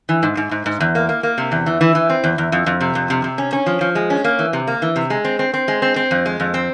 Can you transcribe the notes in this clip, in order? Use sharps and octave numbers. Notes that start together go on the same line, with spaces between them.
E3
G#2
G#2
G#2
G#2
E2
A#3
A#3
A#3
C3
E2
E3
E3
E3
C4
E2
E2
F2
F2
C3
F2
C3
C3
C#4
C#4
F3
F3
G#3
C#4
A#3
E3
C3
A#3
E3
C3
G#3
C4
C4
C4
G#3
C4
C4
F2
G#3
F2
C4